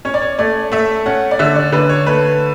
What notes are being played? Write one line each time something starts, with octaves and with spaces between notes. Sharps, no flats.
C#4 C#5
D5
C#5
A3 D5
A3 E5
C#4 F#5
D5
D3 E5
D5
D3 B4
C#5
A3 B4